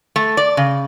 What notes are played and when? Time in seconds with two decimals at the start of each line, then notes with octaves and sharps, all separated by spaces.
0.16 A3
0.37 D5
0.57 C#3